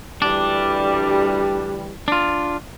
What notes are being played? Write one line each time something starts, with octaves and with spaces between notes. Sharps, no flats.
D2 E3 G3 D4
D4 F4